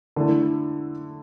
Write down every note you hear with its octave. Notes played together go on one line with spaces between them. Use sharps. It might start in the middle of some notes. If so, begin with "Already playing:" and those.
D3 A3 E4 A4